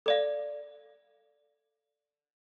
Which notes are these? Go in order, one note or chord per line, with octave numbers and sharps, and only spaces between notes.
A4 D5 F5